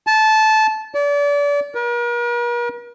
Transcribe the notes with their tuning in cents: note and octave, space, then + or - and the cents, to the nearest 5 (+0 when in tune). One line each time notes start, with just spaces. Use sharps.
A5 -15
D5 -35
A#4 +45